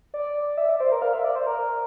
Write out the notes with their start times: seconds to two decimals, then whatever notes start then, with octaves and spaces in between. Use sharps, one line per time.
0.14 D5
0.57 E5
0.69 D5
0.80 C5
0.92 A#4
1.02 F5
1.13 E5
1.24 D5
1.36 C5
1.47 A#4